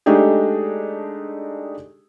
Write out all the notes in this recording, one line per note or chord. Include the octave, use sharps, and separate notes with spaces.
G#3 A3 D4 D#4 G4 G#4